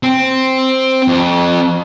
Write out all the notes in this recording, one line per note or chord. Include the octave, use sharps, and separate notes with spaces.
C4
F2